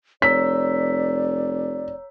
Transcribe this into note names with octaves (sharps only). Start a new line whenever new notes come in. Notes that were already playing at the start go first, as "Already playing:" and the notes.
F1 C#5 D5 A#5 E6 B6